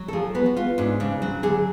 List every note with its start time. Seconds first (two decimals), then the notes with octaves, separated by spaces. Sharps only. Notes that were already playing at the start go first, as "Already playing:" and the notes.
Already playing: F#3
0.08 A4
0.13 F3 G#4
0.35 B3 B4
0.46 F#4
0.56 B3 F4
0.78 G#2 D4
1.00 C#3 D4
1.22 F#3 F#4
1.43 D3 G#4